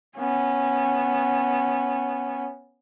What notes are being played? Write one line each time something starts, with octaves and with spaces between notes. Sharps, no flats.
B3 C#4